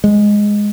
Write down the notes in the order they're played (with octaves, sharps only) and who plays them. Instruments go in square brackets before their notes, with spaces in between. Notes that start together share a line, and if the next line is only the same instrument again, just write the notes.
[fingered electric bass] G#3